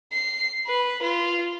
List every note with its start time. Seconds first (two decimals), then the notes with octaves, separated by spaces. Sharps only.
0.12 C7
0.67 B4
1.02 F4